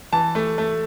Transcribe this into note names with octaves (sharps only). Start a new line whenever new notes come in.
E3 A5
A3
A3